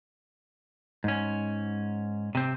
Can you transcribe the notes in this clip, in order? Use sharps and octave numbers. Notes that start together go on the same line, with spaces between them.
G#2 C#4
C3 C4